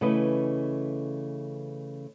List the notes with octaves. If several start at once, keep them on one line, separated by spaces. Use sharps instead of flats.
C#3 E3 A3 B4 D#5